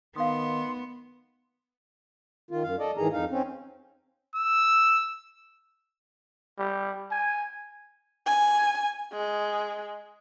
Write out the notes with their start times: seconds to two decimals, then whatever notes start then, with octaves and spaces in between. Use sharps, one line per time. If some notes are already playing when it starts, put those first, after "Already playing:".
0.16 D#3 B3 F5 C6 D#6
2.51 D#3 F4
2.63 F#2 F5
2.79 A4 D5 D#5
2.97 G#2 D#3 E3 G#4 A#5
3.12 F2 D#4 F5
3.30 C4 C#4
4.36 E6
6.58 G3
7.11 G#5
8.26 G#5
9.13 G#3